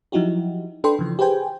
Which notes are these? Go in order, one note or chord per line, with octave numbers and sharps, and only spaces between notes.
F3 F#3 D#4 E4 F#4 G4
D4 A4 B4 G5 B5 C6
C#3 E3 F3
G4 G#4 B4 C5 G5 G#5